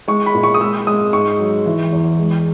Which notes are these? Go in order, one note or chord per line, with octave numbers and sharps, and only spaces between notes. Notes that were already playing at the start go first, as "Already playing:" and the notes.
G#3 C#6
B5
A#2
C#6
D#6
G#3 E6
G#3 D#6
G#2 C#6
F#3
E3
E2
G#3